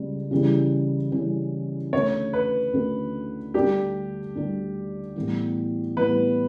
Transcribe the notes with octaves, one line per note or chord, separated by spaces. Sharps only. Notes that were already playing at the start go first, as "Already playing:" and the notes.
Already playing: C#2 C#3 G3
C#3 E3 G3 C#4 E4
C#3 E3 G3 C#4 E4
D2 D3 A3 C#4 C#5
B4
D2 D3 A3 C#4
D2 D3 G3 D4 G4
D2 D3 G3 D4
A2 E3 G3 B3 E4
A2 E3 G3 B3 E4 B4